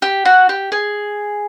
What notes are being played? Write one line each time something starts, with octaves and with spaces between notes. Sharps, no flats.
G4
F#4
G4
G#4